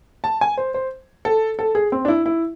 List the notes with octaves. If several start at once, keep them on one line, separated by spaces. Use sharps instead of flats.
A5
G#5
C5
C5
A4
A4
G#4
C4
D4
E4
E4